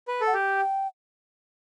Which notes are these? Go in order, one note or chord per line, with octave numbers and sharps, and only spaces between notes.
B4
A4
F#5
G4 G5